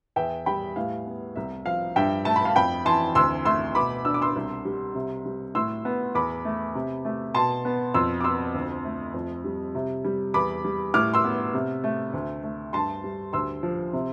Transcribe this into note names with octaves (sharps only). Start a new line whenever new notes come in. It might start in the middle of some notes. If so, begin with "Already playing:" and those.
E2 E5 G5
G3 G5 B5
A2 F5
B3
C2 E5
F3 F5
G2 E5 G5
A3 A5
B5
F5 A5
F2 G5 B5
E3 A5 C6
D2 C6 E6
A3 C6 E6
B2 B5 D6
D4 E6
D6
C6 E6
C2
G3
C3
G3
A2 C6 E6
B3
E2 B5 D6
A3
C3
A3
B2 A5 C6
B3
F2 C6 E6
D6
B3 C6 E6
D2
A3
F2
G3
C3
G3
E2 B5 D6
G3
A2 D6 F6
C6 E6
B3
C3
A3
D2
A3
G2 A5 C6
G3
D2 C6 E6
F3
C3